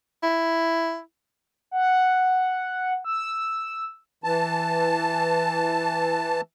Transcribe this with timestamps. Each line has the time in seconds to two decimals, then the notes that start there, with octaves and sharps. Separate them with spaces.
0.23 E4
1.71 F#5
3.05 E6
4.24 E3 A5